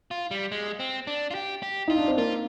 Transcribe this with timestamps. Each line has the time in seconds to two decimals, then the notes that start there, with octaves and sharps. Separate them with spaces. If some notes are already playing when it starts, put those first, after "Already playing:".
0.11 F4
0.31 G3
0.52 G#3
0.79 C4
1.07 D4
1.31 F4
1.35 G4
1.63 G4
1.88 D#4 F4
1.98 D4
2.08 C4
2.17 A#3 F4